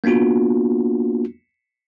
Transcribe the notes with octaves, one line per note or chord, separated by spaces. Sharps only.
A#3 B3 D4 F4 F#4